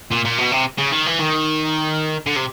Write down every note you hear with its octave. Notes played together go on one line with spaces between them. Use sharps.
A#2
A#2
B2
C3
C#3
D#3
E3
D#3
D3
C3